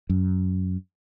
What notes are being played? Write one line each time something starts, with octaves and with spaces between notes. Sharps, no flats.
F#2